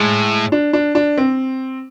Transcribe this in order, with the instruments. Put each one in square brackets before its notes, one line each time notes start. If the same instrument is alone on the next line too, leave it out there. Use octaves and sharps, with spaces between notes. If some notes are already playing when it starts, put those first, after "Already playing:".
Already playing: [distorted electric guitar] A2 [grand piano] G#3
[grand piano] D4
D4
D4
C4